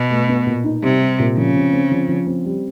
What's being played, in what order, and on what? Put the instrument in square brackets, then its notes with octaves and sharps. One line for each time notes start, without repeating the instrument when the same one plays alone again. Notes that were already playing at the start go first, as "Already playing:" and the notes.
Already playing: [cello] B2
[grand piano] A3
B3
A#2
D#4
[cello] C3 [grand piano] G3
[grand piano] G3
A#2
[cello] C#3 [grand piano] F3
[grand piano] C4
C4
F3
F3
C4
G3